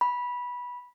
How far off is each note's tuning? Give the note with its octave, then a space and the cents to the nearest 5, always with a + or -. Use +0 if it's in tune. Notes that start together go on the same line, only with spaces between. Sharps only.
B5 -15